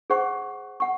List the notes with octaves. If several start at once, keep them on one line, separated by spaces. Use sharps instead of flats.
G#4 C5 F#5 C#6
F#5 C#6